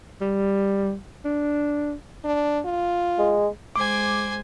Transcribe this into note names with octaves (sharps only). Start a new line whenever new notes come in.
G3
D4
D4
F4
G#3
G#3 C5 G#5 D6